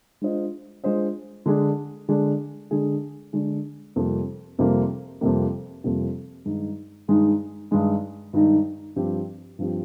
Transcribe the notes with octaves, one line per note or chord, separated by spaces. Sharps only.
G#3 D4 F4 C5 D#5
G#3 D4 F4 C5 D#5
D3 G#3 D4 G#4
D3 G#3 D4 G#4
D3 G#3 D4 G#4
D3 G#3 D4 G#4
F2 C3 G3 A#3
F2 C3 G3 A#3
F2 C3 G3 A#3
F2 C3 G3 A#3
G2 D#3 G#3 D#4
G2 D#3 G#3 D#4
G2 D#3 G#3 D#4
G2 D#3 G#3 D#4
G2 F3 C4 G4
G2 F3 C4 G4